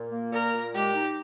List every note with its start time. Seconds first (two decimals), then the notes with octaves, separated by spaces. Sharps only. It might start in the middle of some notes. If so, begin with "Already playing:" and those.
Already playing: A#2
0.11 A#3
0.32 A#2 A#4
0.53 A#2
0.74 G#3 G4
0.95 D#4